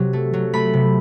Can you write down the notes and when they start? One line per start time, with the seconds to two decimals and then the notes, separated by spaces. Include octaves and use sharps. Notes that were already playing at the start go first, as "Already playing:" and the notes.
Already playing: C3 F#3
0.13 A3
0.33 F#3
0.53 A3 B5
0.74 C3